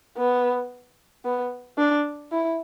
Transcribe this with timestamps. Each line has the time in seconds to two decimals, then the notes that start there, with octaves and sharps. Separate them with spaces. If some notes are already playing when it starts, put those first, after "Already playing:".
0.17 B3
1.25 B3
1.78 D4
2.32 E4